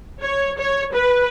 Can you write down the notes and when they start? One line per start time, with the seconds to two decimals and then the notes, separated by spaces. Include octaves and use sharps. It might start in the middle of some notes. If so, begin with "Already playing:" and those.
0.21 C#5
0.59 C#5
0.93 B4